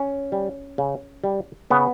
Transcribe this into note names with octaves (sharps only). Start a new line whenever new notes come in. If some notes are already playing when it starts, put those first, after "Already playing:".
Already playing: C#4
G3
C#3
G3
C#3 B3